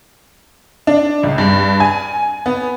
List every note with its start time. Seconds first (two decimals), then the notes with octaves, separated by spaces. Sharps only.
0.87 D4
1.23 C#2
1.38 G2
1.80 G#5
2.46 B3